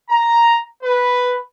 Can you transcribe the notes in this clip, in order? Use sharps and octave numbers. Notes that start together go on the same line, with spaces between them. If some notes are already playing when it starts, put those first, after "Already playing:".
A#5
B4